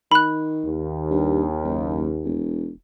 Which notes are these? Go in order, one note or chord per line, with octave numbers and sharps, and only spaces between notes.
D#3 B5 F#6
D#2
G2
F#1
E1